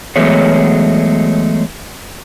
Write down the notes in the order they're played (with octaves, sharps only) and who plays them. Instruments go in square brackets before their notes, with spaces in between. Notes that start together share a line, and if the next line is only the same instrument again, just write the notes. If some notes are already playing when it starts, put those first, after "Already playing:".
[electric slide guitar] E3 F#3 G#3 A3 B3 C#5